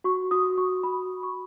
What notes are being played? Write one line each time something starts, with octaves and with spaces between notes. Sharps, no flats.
F#4 C#6
F#4 D#6
F#4 C#6
F#4 B5
F#4
C#6